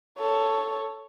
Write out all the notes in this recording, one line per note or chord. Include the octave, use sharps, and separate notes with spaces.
A4 C#5